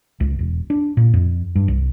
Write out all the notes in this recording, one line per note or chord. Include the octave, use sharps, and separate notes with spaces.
C#2
E1
D4
A#2
F2
G2
C2